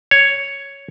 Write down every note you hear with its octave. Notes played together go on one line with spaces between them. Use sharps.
C#5